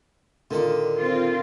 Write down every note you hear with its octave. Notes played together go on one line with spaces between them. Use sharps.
A#2 D3 D#3 A4
C4 F4